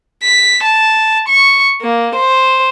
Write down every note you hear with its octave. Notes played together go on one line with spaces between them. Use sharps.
B6
A5
C#6
A#3
C5